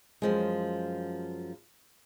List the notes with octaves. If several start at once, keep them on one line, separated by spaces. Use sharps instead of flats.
F#2 F3 G#3